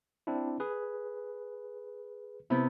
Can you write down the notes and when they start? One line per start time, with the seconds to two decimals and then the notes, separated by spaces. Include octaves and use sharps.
0.27 C4 D4 E4
0.60 G#4 B4
2.50 C3 B3 E4